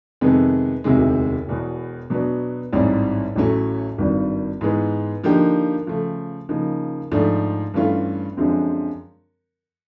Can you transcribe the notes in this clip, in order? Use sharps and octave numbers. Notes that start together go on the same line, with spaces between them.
F2 C3 D#3 G#3 B3
E1 D2 C3 D#3 G#3
E1 E2 B2
B2 F#3 B3 D4
A1 G#2 E3 G3 C4
A1 A2 F#3 A3 C#4
G#1 G2 D#3 G3
G#2 E3 G#3 B3
D3 F3 A#3 D#4 G4
C#3 F3 A3
C#3 F3 A#3 D#4
G#2 F3 A3 D4
G2 E3 A3 C#4 F4
F#2 D3 F3 G#3 C4